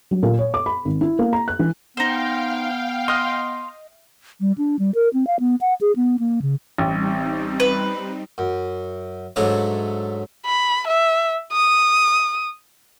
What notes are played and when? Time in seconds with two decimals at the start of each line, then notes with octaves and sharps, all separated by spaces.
0.11 F#3
0.23 A#2
0.39 C#5
0.54 D6
0.66 B5
0.85 G#1
1.01 E4
1.19 A#3
1.33 A#5
1.48 F#6
1.59 E3
1.97 B3 D#4 C5 F5 G5
3.08 D#5 C6 F6
4.41 G3
4.58 D4
4.79 G3
4.95 A#4
5.13 C4
5.27 F5
5.40 B3
5.61 F#5
5.81 G#4
5.96 B3
6.19 A#3
6.42 C#3
6.78 A1 G3 C4 D#4
7.60 B4
8.38 F#2
9.36 G#2 F#3 A3 D4 C#5 E5
10.46 B5
10.87 E5
11.53 D#6